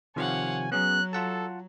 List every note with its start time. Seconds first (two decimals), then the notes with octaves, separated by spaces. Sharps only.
0.16 C3 D#3 F3 C#5 F5 F#5 G#5
0.72 F#3 B3 C#4 G#4 F#6
1.13 F4 A4 F#5 A5